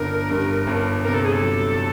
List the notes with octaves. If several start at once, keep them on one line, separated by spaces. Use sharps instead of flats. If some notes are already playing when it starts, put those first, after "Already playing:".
Already playing: G1 D3 A#4
G2
G1
C3 A#4
A4
G#4
A4
F#3